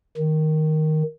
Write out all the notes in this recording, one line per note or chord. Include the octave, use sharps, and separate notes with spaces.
D#3